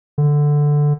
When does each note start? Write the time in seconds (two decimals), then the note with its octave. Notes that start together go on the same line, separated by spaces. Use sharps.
0.18 D3